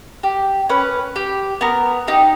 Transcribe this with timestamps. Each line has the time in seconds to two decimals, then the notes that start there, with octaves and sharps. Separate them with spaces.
0.23 G4
0.69 C#4 B4
1.16 G4
1.61 B3 A#4
2.08 D#4 G4